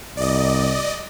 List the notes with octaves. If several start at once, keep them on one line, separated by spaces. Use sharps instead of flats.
C2 D5 D#5